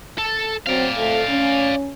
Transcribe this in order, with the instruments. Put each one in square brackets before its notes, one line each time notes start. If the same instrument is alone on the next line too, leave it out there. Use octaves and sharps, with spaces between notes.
[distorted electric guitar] A4
[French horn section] F#3 C4 [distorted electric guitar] D5 F5
[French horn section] F2 A3
C#4